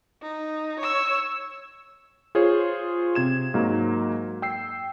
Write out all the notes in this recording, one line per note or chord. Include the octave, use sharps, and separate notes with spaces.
D#4
C#5 E6
F4 G#4 C5 C#5
C3 G#6 E7
G#2 F#3 A#3
G5 E6 C7